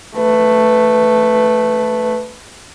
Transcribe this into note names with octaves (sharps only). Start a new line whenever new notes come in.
A3 B4